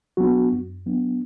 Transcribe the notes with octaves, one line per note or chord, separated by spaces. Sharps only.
F#3 B3 D4 F#4
F#2
F#3 B3 D4